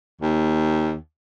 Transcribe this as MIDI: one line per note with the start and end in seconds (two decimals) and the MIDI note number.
0.21 0.95 39